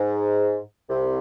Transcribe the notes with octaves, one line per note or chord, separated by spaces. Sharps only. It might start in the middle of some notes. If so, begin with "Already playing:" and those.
Already playing: G#2
C2 C3